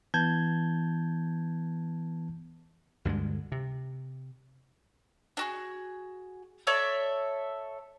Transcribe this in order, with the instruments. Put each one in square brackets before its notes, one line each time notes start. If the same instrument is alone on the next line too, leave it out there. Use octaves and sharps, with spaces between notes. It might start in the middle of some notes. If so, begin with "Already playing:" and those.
[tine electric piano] E3 B3 A5 G6 G#6
[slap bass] D2 G2 D3 G#3
C3
[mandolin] D4 F#4 G#4
A4 C#5 D5 E5